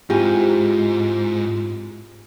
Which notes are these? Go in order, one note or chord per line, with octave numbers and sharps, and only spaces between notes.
G#2 C4 E4 F4 G4 G#4 G#5